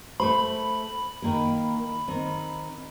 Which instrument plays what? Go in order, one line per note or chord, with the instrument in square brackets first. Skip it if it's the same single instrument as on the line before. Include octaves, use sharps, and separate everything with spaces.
[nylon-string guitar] A3 C5 [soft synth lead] B5
[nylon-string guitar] D#3 A#3 A#4
D#3 C4